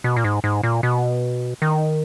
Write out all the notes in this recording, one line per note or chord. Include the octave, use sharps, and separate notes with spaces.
B2
A#2
G#2
G#2
A#2
B2
D#3